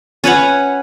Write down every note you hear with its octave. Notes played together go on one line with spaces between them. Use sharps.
C#4 B4 C#5 F#5